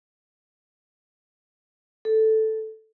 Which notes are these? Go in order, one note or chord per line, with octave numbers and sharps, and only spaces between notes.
A4